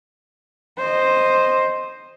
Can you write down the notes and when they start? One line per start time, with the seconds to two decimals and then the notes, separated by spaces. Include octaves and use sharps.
0.77 C5 D#5